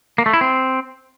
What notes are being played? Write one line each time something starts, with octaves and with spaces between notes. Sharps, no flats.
A#3
A3
E4
C4